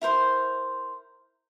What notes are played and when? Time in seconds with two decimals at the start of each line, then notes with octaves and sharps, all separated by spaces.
0.02 E4 A#4 C5 C6